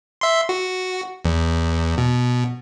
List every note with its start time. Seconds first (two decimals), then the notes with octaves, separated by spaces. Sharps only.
0.21 E5 C6
0.49 F#4
1.25 E2
1.98 B2